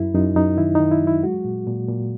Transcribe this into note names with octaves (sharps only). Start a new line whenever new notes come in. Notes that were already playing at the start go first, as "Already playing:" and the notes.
Already playing: F#2 E4
F#2 D#4
F#2 D#4
D#3 E4
D#3 D#4
E4
F#3
E4
G#3 F#4
A#2
A#2
A#2